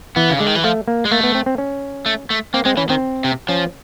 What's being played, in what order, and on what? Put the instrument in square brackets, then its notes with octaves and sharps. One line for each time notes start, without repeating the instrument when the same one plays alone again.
[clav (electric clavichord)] E3 [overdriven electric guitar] B3
[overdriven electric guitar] C#3
[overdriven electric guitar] D3 [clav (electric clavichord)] G#3
[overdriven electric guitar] D#3
E3
[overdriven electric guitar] F3 [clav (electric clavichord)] A3
[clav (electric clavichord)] A#3
[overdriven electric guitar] G#3
[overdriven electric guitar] A3 [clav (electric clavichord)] A#3
[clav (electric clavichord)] B3
C4
C4
C#4
[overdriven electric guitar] A3
A3
[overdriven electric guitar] A#3 [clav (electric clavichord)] C4
[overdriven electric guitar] G#3 [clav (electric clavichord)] C4
[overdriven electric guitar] E3 [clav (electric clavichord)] C#4
[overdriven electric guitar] D#3 [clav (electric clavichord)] C4
[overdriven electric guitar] C3
[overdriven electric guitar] F3 [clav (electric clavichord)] C#4